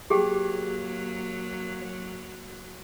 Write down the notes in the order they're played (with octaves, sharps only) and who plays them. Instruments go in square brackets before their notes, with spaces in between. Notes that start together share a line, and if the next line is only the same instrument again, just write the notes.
[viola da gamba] F#3 A#3 [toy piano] G4 G#4 G5